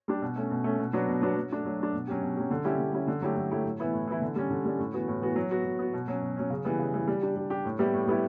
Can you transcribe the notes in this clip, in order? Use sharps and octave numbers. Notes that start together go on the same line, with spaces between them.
G3 D4 G4
B2
A3 C#4
B2
A3 C#4
B2
F#3 B3 D4 F#4
B2
F#3 B3 D4 F#4
F#3
A3 D4
F#3
A3 D4
B2
F#3 C#4 G4
B2
F#3 C#4 G4
D3
G3 C#4 E4 G4
D3
G3 C#4 E4 G4
D3
F#3 A3 E4 G4
D3
F#3 A3 E4 G4
A2
E3 B3 E4
A2
E3 B3 E4
D3
G3 C#4
D3
G3 C#4
A2
E3 B3 F#4
A2
E3 B3 F#4
F#3
B3 F#4
F#3
B3 F#4
B2
F#3 C#4
B2
F#3 C#4
C#3
E3 G3 B3
C#3
E3 G3 B3
G3
D4 G4
G3
D4 G4
A2
G3 B3 E4 G4
A2
G3 B3 E4 G4